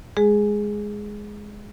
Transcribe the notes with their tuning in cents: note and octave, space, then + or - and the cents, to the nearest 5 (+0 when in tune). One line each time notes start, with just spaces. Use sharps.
G#3 +0 G#4 +0